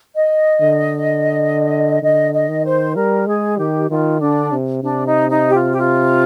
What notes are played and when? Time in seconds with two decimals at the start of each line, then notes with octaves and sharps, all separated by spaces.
0.15 D#5
0.61 D3
2.02 D3 D#5
2.33 D#5
2.49 D#3
2.65 C5
2.96 G3 A#4
3.27 G#3 G#4
3.58 D#3 G4
3.90 D#3 F4
4.21 D3 D4
4.52 C3
4.83 C3 D4
5.07 D#4
5.29 D#4
5.48 G4
5.54 F4
5.71 G4
5.77 F4